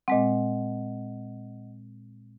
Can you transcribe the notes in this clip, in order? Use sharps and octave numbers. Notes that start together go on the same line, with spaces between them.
A#2 G#3 C4 D#5 F#5